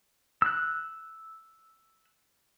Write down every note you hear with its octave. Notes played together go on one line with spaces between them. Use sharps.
E6 F#6